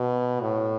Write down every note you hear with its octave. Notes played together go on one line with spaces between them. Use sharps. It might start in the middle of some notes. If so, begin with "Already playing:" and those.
Already playing: B2
A2